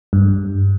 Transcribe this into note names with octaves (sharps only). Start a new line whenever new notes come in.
G2